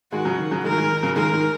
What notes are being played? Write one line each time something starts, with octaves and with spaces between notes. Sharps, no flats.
D#3 G#3 F#4
C#3 F#3
D#3
C#3 F#3
D#3 G#3 A#4
F#3
D#3 G#3
D#3
C#3 F#3
D#3 G#3 A#4
D#3 G#3